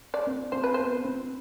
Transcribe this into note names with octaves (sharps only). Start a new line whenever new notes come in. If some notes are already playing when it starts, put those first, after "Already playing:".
D5
C4
C4 C5
B4
C5
B3
C4